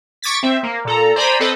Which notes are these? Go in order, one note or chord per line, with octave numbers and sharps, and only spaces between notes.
C#6 D6 G#6 A6 B6
C4 E5
A#3
A#2 A4 A#5
C5 D5 G#5 A#5 B5
C4 A4 B4 D#5